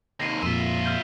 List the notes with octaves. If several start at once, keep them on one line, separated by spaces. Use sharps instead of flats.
D#2 C3 A#6 C7 D#7
F2 A#2 F4 E5 B6 D#7
F6 G6